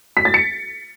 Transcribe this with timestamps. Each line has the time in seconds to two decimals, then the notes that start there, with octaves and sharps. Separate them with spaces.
0.17 B6
0.25 A6
0.34 C#7